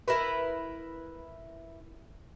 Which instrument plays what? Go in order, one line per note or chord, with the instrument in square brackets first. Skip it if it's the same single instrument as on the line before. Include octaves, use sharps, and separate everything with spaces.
[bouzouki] E4 A#4 B4